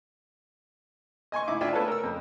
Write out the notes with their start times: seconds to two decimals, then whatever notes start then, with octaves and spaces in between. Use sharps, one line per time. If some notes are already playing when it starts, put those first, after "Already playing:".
1.32 D#5 G#5 C6 C#6
1.47 D#4 E4 D6
1.61 D4 E4 F4 E5 G5 G#5
1.73 B3 A4 B4 C#5 A5
1.88 A#4 E6
2.04 F2